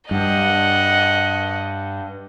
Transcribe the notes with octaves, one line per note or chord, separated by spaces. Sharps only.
G2 D#5 F#5